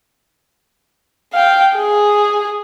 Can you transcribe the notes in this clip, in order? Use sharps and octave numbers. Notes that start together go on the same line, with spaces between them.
F5 G5
G#4